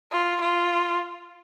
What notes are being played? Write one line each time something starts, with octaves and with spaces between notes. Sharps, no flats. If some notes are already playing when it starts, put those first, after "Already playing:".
F4
F4